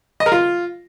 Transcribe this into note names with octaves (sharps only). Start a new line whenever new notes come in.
D#5
A#4
F4